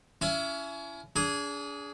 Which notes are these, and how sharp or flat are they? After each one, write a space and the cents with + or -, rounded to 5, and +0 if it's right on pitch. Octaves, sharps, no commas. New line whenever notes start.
C#4 +30 E4 +30
D4 -35 G#4 +0